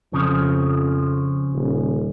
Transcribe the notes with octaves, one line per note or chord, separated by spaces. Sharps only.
F2 C#3 F3
D#1